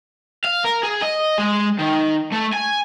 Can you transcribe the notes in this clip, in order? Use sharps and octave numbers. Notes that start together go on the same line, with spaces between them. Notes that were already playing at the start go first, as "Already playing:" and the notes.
F5
A#4
G#4
D#5
G#3
D#3
A3
G#5